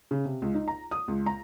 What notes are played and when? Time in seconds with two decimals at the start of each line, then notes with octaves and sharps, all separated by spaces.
0.11 C#3
0.25 C3
0.42 C#2
0.54 D#4
0.68 A#5
0.91 D#6
1.08 C#2
1.26 A#5